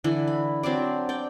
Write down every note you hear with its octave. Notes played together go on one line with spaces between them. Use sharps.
D3 E3
B5
F#3 C4 D4 D5
D5 G5